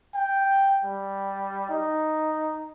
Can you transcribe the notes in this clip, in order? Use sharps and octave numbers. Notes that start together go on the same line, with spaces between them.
G5
G3
D#4